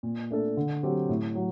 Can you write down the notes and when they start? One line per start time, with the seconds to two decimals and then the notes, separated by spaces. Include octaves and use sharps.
0.03 A#2
0.30 A3 D4 A4
0.57 D3
0.83 F#3 C4 G4
1.09 A2
1.35 F#3